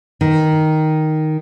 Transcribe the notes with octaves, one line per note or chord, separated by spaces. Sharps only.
D#3